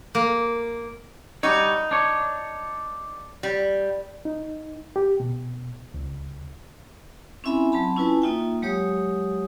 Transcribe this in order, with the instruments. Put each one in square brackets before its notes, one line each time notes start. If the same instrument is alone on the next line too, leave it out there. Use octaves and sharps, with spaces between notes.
[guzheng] A#3
[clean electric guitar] G3 F#4 C#5 [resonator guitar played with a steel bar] D#4
[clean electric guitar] D4 C#5
[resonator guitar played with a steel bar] G3
[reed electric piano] D#4
G4
B2
C#2
[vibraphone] C4 C#4 E4 E5 G#5 B5
F#3 C4 A5 B5
C#4 E4 F4 B4 G#5 A5
A#3 D#4 F4 E5 G5
F#3 G#3 G4 C#5 D#6